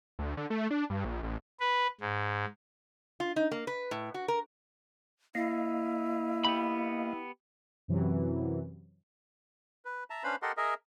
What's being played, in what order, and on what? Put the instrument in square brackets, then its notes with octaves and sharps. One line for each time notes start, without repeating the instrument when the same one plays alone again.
[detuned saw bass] D2
D3
A3
D4
G2
A#1
A1
[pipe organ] B4
G#2
[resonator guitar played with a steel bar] F4
D#4
A#3
B4
A2
F#4
A#4
[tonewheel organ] A#3 D#5 F5 [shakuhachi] E4
[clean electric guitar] B3 G4 B5
[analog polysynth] F#2 C3 E3 F#3
[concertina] B4
E5 A5 A#5
C#4 D4 B4 C5 F5 B5
G4 A4 A#4 D#5 F#5 C6
G#4 A#4 D#5 E5